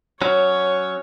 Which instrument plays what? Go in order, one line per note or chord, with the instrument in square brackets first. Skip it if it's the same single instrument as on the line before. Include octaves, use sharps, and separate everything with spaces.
[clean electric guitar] F#3 C#4 [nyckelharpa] C#5